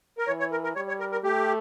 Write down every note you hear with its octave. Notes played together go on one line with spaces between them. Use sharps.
A#4
E3 C#5
C#5
A#4
A#4
G3 C#5
C#5
A#4
A#4
A3 G4